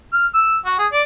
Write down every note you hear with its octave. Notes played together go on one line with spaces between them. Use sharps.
F6
E6
F#4
G#4
D5